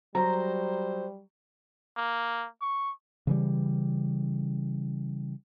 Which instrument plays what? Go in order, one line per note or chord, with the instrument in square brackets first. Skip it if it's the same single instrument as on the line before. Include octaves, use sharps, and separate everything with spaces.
[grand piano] F#3 [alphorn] G3 [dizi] C5 [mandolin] A#5
[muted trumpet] A#3
C#6
[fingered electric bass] C#3 E3 G3